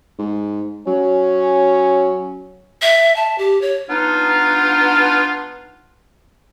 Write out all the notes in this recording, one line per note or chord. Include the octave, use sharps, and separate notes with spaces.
G#2
F#3 C#4
E5
A5
G4
C#5
B3 D4 D#4 F4